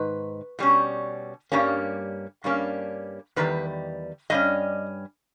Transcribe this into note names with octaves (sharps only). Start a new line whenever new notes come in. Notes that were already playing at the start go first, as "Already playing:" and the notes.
Already playing: G#2 D#3 B4
B2 G3 C#4
G2 G3 A#3 C#4
G2 G3 A#3 C#4
E2 D#3 G3 B4
G2 G3 C#4 D#5